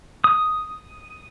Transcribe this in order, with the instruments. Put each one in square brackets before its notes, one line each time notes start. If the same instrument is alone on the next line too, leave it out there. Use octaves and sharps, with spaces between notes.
[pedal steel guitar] D#6